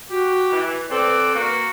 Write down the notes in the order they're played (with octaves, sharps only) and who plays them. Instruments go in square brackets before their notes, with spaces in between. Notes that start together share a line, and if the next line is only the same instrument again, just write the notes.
[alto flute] F#4 [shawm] G4
[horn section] E3
[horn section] C4 A4 [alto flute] B4 [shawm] D5
[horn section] A#3 [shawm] F#4